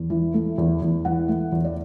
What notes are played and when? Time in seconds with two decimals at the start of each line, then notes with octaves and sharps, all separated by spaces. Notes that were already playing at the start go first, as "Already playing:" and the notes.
Already playing: E2
0.10 E3
0.34 A3
0.58 E2
0.82 E2
1.05 E3 F#5
1.28 A3
1.52 E2
1.65 D5